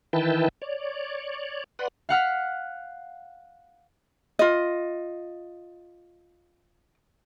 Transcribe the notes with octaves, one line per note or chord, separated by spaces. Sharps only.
D#3 E3 E4 B4 G5 A5
C#5 D5
B4 D5 F#5 C6
F5 F#5 F6 B6
F4 D#5